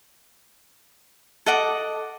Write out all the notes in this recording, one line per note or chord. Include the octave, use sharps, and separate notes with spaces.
A4 D#5 F#5 D6